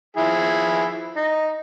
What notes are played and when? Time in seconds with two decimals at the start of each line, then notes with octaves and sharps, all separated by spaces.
0.17 F3 E4 G#4
1.16 D#4